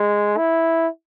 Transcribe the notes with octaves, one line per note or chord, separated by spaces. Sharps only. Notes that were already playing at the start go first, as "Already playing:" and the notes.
Already playing: G#3
E4